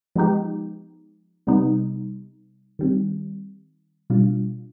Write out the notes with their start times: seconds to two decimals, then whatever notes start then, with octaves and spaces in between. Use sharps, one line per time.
0.15 F3 G#3 B3 D#4 G4
1.47 C3 G3 B3 D#4
2.79 D#3 G3 C4
4.10 B2 G3 D4 F4